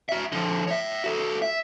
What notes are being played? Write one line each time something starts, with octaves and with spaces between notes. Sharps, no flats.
F#4 E5
D3 F3
C#5 E5
F#4 A4
E5